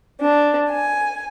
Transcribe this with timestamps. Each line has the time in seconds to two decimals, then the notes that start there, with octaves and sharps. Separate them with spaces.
0.20 D4
0.70 G#5